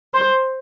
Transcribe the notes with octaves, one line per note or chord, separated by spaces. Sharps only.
C5